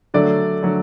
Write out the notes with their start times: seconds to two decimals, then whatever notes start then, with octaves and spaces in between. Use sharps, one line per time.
0.14 D3 F#3 A3 D5
0.63 D3 F#3 A3